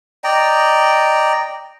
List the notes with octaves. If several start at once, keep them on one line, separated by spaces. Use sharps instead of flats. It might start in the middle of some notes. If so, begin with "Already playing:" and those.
D5 D#5 G5 A#5